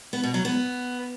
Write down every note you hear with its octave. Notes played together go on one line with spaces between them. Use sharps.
B3
B2
F#3
B3